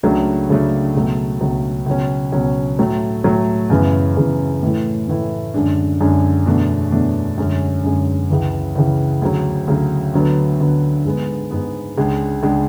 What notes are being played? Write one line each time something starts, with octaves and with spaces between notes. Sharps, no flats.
C#2 C#3 F#3 A3 D4
C#2 C#3 F#3 A3 D4
C#2 B2 F#3 A3
C#2 B2 F#3 A3
C#2 B2 F#3 C#4
C#2 B2 F#3 C#4
A2 F#3 A3
A2 F#3 A3
F#2 C#3 E3 B3
F#2 C#3 E3 B3
A2 E3 A3 E4
A2 E3 A3 E4
F#2 D3 G#3 D4
F#2 D3 G#3 D4
E2 B2 A3 D4
E2 B2 A3 D4
F#2 D3 G#3 C#4
F#2 D3 G#3 C#4
C#2 C#3 E3
C#2 C#3 E3
D2 C#3 F#3
D2 C#3 F#3
D2 D3 F#3 B3
D2 D3 F#3 B3
G#2 G#3 B3
G#2 G#3 B3
C#2 C#3 G#3 D4
C#2 C#3 G#3 D4